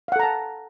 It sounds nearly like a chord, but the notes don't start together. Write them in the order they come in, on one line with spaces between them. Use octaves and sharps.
F5 F#5 A4 A#5 A5